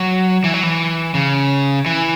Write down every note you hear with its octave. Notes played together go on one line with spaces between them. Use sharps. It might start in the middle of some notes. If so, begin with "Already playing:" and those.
Already playing: F#3
E3
F#3
E3
C#3
E3